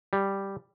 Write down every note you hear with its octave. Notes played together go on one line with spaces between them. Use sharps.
G3